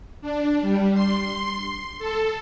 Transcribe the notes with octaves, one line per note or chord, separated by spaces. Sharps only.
D4
G3
C6
A4